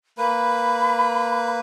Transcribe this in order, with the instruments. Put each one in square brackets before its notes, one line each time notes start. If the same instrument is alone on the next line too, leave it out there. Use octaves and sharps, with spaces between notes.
[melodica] A#3 B4 [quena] B5